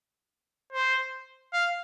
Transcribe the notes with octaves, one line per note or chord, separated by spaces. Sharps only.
C5
F5